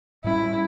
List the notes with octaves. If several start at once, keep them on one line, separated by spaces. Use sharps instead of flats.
A2 G3 C#4 E4